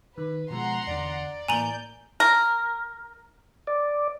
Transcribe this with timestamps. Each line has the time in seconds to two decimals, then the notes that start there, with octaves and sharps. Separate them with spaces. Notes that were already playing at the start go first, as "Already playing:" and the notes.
0.18 D#3 B4
0.50 B2 F3 G#3 F#5 A#5 C6
0.87 E2 D3 D5
1.48 A2 E3 A#3 G#5 A#5 G6 F#7
2.20 A#4
3.67 D5